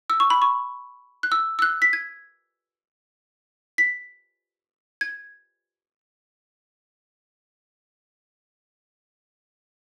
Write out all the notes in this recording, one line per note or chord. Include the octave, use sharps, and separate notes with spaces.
E6
C#6
B5
C#6
F#6
E6
E6
F#6
B6
G#6
B6
G#6